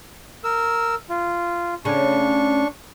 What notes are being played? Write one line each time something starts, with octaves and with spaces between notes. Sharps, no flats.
A#4 E6
F4
C#3 A3 C#4 D4 C#6